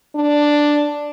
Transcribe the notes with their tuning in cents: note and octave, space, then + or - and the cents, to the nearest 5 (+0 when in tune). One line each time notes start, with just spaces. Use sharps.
D4 +5